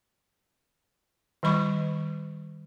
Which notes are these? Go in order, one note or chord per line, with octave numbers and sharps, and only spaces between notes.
D#3 G3 B5 C#6